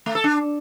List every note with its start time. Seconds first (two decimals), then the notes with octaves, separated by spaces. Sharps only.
0.06 A3
0.15 A4
0.24 D4